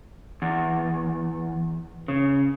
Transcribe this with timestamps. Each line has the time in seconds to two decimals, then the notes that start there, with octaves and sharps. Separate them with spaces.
0.42 E2
2.08 C#3